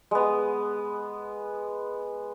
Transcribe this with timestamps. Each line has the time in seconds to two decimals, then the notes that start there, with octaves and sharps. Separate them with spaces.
0.11 G#3 B3